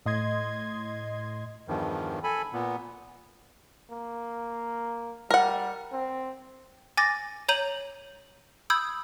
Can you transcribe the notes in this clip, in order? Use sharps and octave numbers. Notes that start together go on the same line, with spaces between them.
A2 D#5 C6 G#6
E2 G2 D#3 F3
A4 G#5 B5
A#2 B3
A#3
G3 A#4 F#5
C4
G#5 D6 A6 A#6
C#5 A#5 G6 D#7 F#7
B5 D#6 E6 G6 G#6